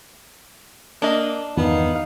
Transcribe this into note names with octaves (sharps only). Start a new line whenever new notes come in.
A#3 D4 D#5
E2 G2 D#3 B3 D#4 F5